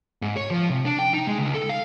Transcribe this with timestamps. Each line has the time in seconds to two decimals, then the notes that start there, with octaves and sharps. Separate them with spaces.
0.22 G#2
0.36 C#5
0.51 F3
0.70 C3
0.85 D4
0.99 G5
1.13 D#4
1.27 G#3
1.38 C#2
1.54 A4
1.69 F5